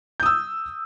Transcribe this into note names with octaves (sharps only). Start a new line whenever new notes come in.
D#6 E6 G6